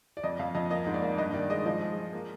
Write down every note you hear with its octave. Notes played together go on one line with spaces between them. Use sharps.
D5
F2 D#5
F2 F5
F2 D#5
A#3 D#5
G#2
D5
A#3
G2 D#5
D#3 D5
G#3 D#5
F3 D#5
G#3
G#3
A#3